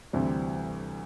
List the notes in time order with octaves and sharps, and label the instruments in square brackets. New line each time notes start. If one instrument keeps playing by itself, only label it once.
[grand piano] D2 C3 E3 G3 C4